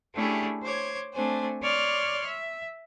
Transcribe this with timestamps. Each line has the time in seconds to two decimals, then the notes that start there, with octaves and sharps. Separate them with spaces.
0.13 A3 C#4 D4 E4 G4 G#4
0.62 C5 C#5 D6 G#6
1.13 A3 C4 D4 C5 G#5
1.61 C#5 D5 C6 F6 F#6
2.26 E5